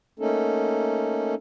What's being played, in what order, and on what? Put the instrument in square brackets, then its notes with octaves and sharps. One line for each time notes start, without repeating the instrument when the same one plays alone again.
[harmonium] A3 A#3 C#4 D#4 A4